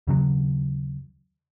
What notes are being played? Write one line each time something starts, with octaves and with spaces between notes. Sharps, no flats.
D#2 C#3 F#3